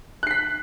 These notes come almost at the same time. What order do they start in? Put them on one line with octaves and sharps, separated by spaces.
F#6 C7 B6